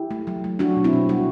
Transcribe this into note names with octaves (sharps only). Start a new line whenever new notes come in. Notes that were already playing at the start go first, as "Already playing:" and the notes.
Already playing: E4 G4
A3
F#3
A3
F#3 D4 F#4
B2
C4 E4
B2
G3 F#4